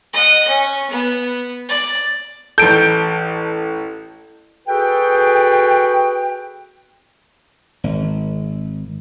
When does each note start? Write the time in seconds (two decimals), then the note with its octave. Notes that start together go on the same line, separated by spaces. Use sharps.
0.13 D#5 F#5
0.48 C#4
0.90 B3
1.69 D5
2.58 A1 A4 G6 D7
4.67 F#4 G#4 A4 B4 G5
7.84 G#1